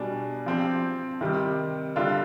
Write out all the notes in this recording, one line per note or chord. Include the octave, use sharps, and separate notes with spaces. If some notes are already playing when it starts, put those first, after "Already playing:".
Already playing: B2 G3 D4 G#4
F3 C4 G4
C3 D#3 G3
D3 G3 D4 F4